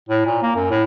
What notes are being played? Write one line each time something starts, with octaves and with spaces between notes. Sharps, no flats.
A2
A#2
A#3
F#2
A2